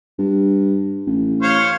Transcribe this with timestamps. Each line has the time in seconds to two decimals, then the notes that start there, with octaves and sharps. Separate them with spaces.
0.18 G2
1.07 A1
1.42 C5 C#5 F5